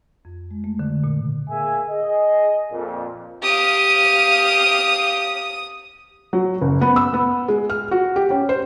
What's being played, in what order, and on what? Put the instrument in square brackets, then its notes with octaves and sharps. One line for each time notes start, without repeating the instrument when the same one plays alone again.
[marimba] F2
G#3
A3
D3
A#2
[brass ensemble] A#3 G#4 E5 G#5
G#4 D#5
F2 A#2
[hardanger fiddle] G4 F5 [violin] D#6 D#7
[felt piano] F#3
F#1
B3
E6
B3
G#3
F6
F#4
G4
C#4
C5